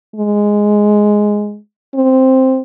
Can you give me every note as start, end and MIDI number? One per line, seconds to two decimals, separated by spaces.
0.16 1.58 56
1.95 2.61 60